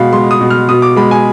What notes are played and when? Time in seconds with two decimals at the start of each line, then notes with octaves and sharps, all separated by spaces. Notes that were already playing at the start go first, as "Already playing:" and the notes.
Already playing: B2 G#3 F5 B5
0.13 G#3 C6
0.31 D#6
0.41 B2
0.50 F6
0.69 B2 D#6
0.82 D6
0.96 G#3 B5
1.11 G#5